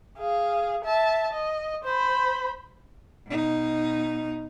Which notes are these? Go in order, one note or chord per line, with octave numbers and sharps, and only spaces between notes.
G#4 F5
E5 A5
D#5
C5 B5
B2 D#4